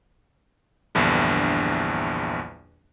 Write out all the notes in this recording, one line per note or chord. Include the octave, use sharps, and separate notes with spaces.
A#1 E2 G2 D3